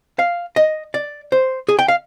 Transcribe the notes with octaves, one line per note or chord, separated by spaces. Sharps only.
F5
D#5
D5
C5
G#4
G5
F5